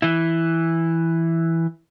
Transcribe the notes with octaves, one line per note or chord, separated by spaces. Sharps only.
E3 E4